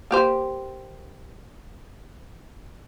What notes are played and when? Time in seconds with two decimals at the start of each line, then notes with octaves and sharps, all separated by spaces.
0.11 A#3 G4 C5